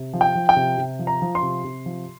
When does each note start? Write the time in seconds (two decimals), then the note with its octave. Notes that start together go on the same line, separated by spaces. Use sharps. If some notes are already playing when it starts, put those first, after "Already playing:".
Already playing: C3
0.14 F3
0.21 G5
0.35 F3
0.49 G5
0.56 C3
0.78 C3
0.99 F3
1.07 A#5
1.22 F3
1.35 C6
1.43 C3
1.64 C3
1.86 F3